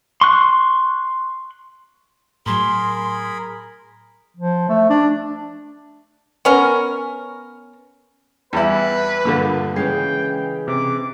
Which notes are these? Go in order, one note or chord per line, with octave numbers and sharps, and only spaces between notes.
C6 C#6 F#6
A2 F#3 G#4 A#4 B5 C6
F3
A3
D4
B3 C#4 A#4
E2 G3 E4 B4 G5
G2 A#2 D3 A#3 F4 A4
C#3 E3 G#3 C#4 G5 G#6 C7
C3 D6